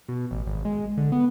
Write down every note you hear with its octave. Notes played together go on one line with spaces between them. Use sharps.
B2
A1
G#1
G#3
D3
B3